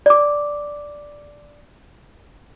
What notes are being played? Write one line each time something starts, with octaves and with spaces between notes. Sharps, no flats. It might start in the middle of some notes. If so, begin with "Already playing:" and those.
D5 D6